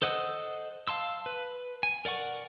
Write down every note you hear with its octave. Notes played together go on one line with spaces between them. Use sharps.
A4 C5 D#5 F#5 E6
F5 A5 C6 E6
B4
G#5
A#4 D5 F#5 C#6